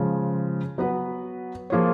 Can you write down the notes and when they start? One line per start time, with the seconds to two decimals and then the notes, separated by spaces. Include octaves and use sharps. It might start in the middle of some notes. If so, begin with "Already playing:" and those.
Already playing: C#3 F3 G#3
0.78 F#3 B3 F#4 B4
1.70 F3 A#3 F4 G#4 C#5